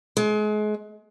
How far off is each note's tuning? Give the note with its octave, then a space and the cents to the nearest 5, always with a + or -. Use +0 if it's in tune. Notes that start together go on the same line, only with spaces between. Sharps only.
G#3 +35